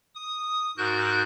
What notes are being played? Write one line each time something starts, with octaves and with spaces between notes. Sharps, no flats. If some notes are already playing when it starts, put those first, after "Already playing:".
D#6
G#2 F#4 A#4 F#6 G6